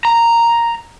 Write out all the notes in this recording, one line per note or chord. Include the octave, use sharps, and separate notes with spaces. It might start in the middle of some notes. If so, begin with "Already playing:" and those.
A#5